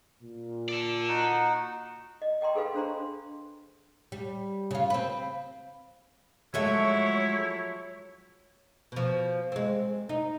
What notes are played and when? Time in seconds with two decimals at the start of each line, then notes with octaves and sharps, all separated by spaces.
0.22 A#2
0.69 A4 D5
1.08 D#4 F#4 F#5
2.22 D#5
2.41 D#5 G5 A#5 C6
2.55 G#4 A4 B4 F5 B5
2.75 D4 C5 A#5 C6
4.12 G3
4.71 C#3 F4
4.90 C4 B4
6.54 F3 F#3 G#3 A3 E4 C#5 E5
8.92 B2 F3
9.52 G#3 C4
10.09 D#4